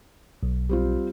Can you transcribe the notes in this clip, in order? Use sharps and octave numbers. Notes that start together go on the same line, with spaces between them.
B1
G3 C4 F4